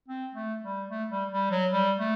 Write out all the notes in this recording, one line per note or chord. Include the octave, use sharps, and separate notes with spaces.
C4
A3
G3
A3
G3
G3
F#3
G3
A3